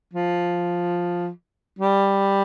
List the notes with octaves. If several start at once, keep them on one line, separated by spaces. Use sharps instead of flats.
F3
G3